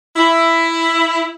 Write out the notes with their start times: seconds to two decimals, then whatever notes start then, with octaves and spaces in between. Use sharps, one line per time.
0.16 E4